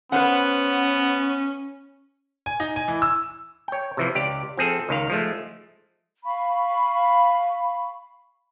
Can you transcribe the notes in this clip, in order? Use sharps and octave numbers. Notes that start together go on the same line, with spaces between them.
B3 C#4 B4 C5 F#5
G#5
D#4
G#5
E3
E6
C#5 G5
C3 E3 F3
C#2 G4 D5
F3 C4 G#4 A4
C#2 D#3 F5
F3 G#3 A3
F5 B5 C#6